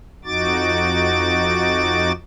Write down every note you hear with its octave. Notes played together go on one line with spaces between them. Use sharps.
F2 D#4 F#4 D6 A6